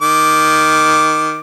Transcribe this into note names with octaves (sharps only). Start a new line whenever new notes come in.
D#3 D6